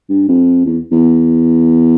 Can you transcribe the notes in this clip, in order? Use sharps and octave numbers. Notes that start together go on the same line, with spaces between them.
G2
F2
E2
E2